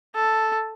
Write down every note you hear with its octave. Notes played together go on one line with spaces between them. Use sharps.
A4